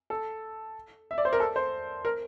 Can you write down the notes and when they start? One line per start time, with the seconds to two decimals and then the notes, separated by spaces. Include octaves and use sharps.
0.10 A4
1.11 E5
1.18 D5
1.25 C5
1.33 A#4
1.40 A4
1.56 C5
2.05 A#4